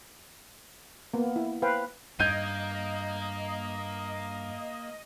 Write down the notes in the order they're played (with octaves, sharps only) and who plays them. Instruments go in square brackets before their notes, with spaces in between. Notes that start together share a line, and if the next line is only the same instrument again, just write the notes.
[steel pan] A#3 B3
E4
B4 C5 F5 G5
[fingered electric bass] G2 [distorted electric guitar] A#3 [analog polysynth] D#5 [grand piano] G6 G#6 D#7